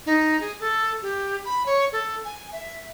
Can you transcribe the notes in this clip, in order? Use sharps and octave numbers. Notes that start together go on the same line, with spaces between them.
D#4
G#4
A4
G4
B5
C#5
A4
G#5
E5